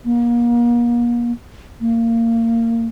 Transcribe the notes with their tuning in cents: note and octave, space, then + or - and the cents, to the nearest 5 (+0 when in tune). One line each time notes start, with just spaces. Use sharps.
A#3 +35
A#3 -25